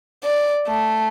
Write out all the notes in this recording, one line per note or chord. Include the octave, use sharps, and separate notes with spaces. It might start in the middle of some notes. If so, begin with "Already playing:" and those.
D5
A3